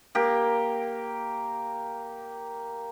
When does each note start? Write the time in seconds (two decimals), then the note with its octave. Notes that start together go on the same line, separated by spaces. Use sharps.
0.15 A#3 G4